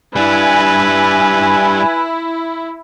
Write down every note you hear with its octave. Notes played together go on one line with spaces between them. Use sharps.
G3 D4 E4 B4 G#5